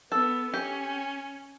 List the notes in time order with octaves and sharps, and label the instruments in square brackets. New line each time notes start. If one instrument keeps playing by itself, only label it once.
[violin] B3 [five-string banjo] A4
[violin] C#4 [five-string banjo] G4